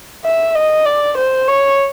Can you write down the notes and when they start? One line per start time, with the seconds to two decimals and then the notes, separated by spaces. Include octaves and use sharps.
0.25 E5
0.55 D#5
0.85 D5
1.17 C5
1.48 C#5